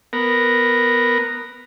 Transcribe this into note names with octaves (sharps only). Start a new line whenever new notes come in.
B3 A#4